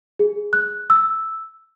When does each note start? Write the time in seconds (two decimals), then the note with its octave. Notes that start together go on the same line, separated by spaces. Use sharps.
0.19 G#4
0.53 F#6
0.90 E6